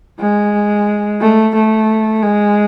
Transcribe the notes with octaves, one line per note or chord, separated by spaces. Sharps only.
G#3
A3
A3
G#3